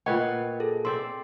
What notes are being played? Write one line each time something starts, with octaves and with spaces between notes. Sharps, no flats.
A#2 B4 C#5 D#5 F#5 G5
D#5
G#4 A4
C4 D5 E5 C6